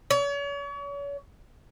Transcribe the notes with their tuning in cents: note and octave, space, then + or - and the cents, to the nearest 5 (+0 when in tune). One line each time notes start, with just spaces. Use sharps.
C#5 +40